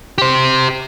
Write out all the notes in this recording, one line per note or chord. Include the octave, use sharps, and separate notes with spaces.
G4 C5